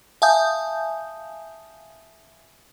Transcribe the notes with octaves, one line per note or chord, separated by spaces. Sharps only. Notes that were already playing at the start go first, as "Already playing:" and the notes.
E5 F5 G#5 A5 D#6 G6